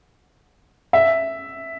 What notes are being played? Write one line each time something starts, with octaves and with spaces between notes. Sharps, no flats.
E5